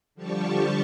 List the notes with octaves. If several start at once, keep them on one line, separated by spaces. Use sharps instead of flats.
D3 F3 G3 G4 A5 C#6